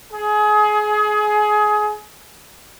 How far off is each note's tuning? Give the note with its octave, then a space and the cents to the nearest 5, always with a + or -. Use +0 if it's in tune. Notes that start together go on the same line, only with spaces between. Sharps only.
G#4 +25